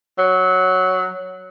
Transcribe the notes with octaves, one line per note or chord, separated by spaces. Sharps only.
F#3